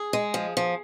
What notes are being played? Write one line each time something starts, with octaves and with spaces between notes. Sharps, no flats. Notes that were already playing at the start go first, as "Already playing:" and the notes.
Already playing: G#4
G#3
F3
F3